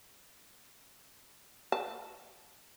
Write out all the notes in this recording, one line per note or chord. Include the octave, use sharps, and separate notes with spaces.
A5